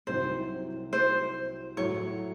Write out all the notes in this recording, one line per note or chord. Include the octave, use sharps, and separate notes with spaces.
C2 C3 D#3 F#3 C5
C5
A2 F#3 A3 C#5